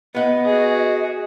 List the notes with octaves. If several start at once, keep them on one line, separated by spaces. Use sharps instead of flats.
B3 D#5 F#5
F#4 G#4